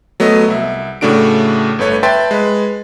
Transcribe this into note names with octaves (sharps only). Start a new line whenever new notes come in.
F#3 A3 B3 D#5
C2 E5
A2 C#3 A3 D4 F#4 D7
G1 A3 B4 C#5
B4 E5 G5 A5 C6 A6
G#3 B4